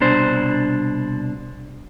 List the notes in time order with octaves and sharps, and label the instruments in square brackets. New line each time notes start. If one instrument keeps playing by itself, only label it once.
[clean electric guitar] C2 B2 D4 C5